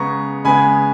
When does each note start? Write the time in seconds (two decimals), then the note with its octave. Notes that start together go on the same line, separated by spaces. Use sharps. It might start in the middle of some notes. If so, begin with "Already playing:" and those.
Already playing: C#3 G#3 B3 A#5 C#6
0.45 C#3 G#3 B3 G#5 B5